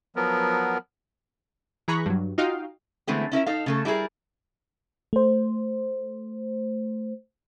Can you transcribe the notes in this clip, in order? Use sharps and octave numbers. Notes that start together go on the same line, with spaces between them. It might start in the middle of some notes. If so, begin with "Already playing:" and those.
F3 F#3 B3 A#4
E3 G#4 A#5 B5 C#6 F#6
G2 F#3
D#4 F4 F#4 D#5 F5 G5
D3 E3 G#3 A3 B3 C4
C#4 E4 A#4 E5
D#4 A4 F5
C#3 A3 A4
G3 E4 F#4 G#4 A#4
A3 C5